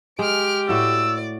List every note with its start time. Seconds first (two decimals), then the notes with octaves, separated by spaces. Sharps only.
0.19 G#3 G4 F6 D7
0.69 A2 F#4 D5 E6